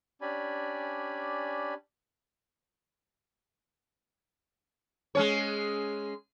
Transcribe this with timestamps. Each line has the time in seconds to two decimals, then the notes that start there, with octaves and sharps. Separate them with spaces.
0.21 C#4 D4 G4 D5 G#5 B5
5.15 G#3 C#4 C#5